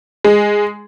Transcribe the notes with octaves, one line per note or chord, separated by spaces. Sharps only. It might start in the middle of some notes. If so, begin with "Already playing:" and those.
G#3